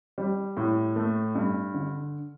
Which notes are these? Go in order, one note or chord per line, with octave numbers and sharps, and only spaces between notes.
G3
A2
A3
G2
D3